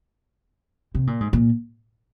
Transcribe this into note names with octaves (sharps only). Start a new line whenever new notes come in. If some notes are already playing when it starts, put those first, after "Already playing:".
C3
A#2
G#2
A#2